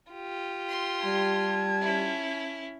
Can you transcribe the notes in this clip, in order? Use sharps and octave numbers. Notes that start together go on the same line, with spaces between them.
F4 G4
C6
G3 A5 G#6
C#4 E4